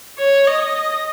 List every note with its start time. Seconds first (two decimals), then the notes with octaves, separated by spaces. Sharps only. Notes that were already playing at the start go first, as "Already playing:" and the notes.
0.19 C#5
0.47 D#5